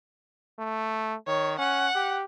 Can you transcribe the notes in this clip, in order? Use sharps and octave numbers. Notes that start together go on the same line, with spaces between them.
A3
D#3 C#5
C#4 F#5
G4